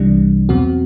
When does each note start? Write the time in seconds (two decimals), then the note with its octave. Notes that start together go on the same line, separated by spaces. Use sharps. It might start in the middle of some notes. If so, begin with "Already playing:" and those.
Already playing: C2 C3 E3 G3 D4
0.49 E2 B2 F#3 C4 F#4